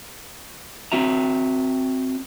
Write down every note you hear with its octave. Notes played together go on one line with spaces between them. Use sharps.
C4 F#4 E5 A#5